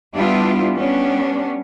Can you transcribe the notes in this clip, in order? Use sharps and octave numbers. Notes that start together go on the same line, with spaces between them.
G3 B3 D4 E4 F4
G3 B3 C#4 D4